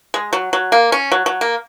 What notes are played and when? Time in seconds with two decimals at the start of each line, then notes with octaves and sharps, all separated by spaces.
0.14 G#3
0.33 F#3
0.53 F#3
0.72 A#3
0.92 C#4
1.12 F#3
1.26 F#3
1.41 A#3